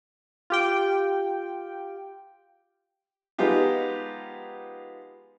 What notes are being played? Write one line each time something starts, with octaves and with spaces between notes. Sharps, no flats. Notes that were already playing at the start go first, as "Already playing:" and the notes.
F4 G4 G5
F3 G#3 B3 D#4 F4 G4